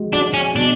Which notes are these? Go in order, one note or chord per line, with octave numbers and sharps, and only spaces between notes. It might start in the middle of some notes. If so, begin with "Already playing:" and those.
Already playing: G#3 F#4
D4 F#4
C#4
B2 D4